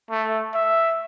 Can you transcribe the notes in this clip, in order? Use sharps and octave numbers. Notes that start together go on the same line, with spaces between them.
A3
E5